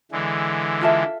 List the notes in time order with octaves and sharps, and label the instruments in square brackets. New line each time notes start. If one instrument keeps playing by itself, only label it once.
[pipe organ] D3 E3 G#3
[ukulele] F4 A4 E5